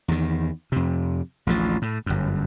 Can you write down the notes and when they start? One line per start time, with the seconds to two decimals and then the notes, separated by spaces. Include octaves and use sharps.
0.08 E2 D#3
0.72 F2 C3
1.47 A1 D2 D3 F3
1.82 A2
2.06 G1 F#2